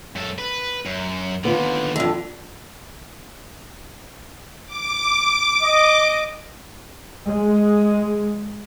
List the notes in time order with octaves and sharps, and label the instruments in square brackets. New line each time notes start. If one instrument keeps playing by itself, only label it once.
[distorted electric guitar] F#2 A4
B4
F#2
[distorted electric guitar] D#2 D3 [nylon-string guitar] B3 F4
[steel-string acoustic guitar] F2 D3
[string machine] D6
[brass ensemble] D#5
[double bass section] G#3